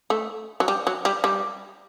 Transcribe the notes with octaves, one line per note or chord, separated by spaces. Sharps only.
A3
F#3
G3
F#3
G3
G3